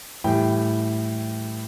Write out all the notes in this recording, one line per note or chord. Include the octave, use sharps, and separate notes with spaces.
A2 E3 G3 G5